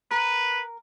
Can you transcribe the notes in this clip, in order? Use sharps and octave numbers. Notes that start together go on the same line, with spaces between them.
A#4 B4